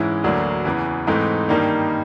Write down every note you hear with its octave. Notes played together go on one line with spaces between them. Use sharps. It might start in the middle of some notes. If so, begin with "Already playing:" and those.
Already playing: G#2 E3 G#3 C#4 E4
D2 D3 F#3 A#3 D4
E2 C#3 E3
G#2 E3 A3 C4 D#4
G2 D#3 G3 A#3 D#4